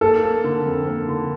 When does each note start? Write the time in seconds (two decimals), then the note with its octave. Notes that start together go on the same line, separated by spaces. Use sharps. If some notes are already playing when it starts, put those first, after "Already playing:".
0.01 A#3 A4
0.23 A#3
0.44 D3
0.66 F2
0.87 A#3
1.08 D3